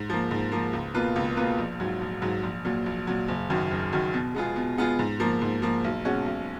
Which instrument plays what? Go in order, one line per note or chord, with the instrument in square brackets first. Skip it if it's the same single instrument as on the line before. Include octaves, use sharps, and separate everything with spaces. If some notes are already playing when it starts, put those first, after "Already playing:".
Already playing: [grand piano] G#2
F3 A#3
G#2
F3 A#3
C#2
B2 A#3 F4 B4
C#2
B2 A#3 F4 B4
A#1
G#2 F#3
A#1
G#2 F#3
A#1
A#2 F#3
A#1
A#2 F#3
F#1
F#2 D#3 F#3
F#1
F#2 D#3 F#3
B2
G#3 B3 F4 G#4
B2
G#3 B3 F4 G#4
G#2
F3 A#3
G#2
F3 A#3
B1
B2 G#3 C#4 F#4
B1